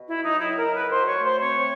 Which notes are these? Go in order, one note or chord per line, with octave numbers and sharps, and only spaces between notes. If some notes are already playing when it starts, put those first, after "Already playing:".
Already playing: B2
E4
F#3
D#4
C#2 E4
A#4
C#2
B4
F#3 C5
C#5
A3
C5
C4 C#5